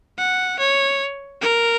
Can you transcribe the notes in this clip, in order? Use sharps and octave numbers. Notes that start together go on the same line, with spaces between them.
F#5
C#5
A#4